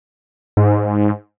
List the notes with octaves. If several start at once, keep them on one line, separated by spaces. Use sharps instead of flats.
G#2